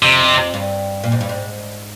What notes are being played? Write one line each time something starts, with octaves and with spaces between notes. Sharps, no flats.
F2 C3
G2
A#2
G#2
G2
G#2